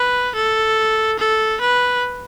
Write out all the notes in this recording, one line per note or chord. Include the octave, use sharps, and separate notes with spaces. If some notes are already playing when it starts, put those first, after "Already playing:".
Already playing: B4
A4
A4
B4